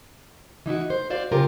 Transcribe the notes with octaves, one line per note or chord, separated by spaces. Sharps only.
E3 D#4 E4 F#4
C5
F#4 C5 D5 F5
C#3 F4 G4 A#4